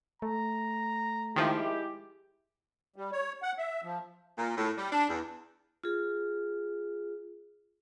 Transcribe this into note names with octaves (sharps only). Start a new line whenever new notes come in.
A3 A#5
D#3 F3 G#3 E4 G4
G3
C#5
F#5
E5
F3
A#2
A2
G3
D4
E2
F4 G#4